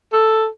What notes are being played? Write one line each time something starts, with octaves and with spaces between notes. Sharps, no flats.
A4